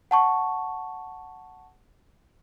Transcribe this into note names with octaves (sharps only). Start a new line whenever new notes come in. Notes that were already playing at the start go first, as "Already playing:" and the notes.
F#5 A5 C#6